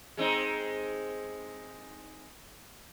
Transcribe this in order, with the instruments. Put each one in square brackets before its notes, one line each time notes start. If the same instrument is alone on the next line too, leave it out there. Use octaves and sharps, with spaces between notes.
[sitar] G#3 C4 D#4